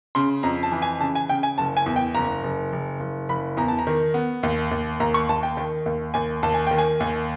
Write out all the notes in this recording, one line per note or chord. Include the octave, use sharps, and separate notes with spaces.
C#3 C6
F2 A#5
A5
E3
G#5
C#3 A5
G#5
C#3 G5
G#5
F#1 A5
G#5
E2
G5
F#1 A#5
F#1
F#1
F#1
F#1 B5
E2 A#5
A5
A#5
D#3
B3
D#2
D#2
D#2 A#5
C#6
D#2 A5
G5
D#3
D#2
D#2 G#5
D#2 A5
G#5
D#3 G5
G#5
D#2